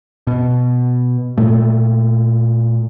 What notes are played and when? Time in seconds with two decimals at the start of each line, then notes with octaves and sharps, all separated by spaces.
0.27 B2
1.37 A#2 A3